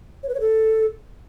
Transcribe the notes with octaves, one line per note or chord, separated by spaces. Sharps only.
C#5
B4
C#5
A4